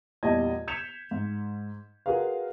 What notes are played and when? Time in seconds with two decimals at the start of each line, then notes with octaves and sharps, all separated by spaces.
0.23 E2 A#2 G3 D#5 A5 G#6
0.68 G6 G#6 B6 C#7 E7 F7
1.11 G#2
2.06 F4 F#4 G#4 A#4 B4 F5